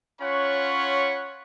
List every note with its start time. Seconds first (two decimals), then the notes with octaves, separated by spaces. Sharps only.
0.21 C#4 F4 C#5 F#5 B5 C#6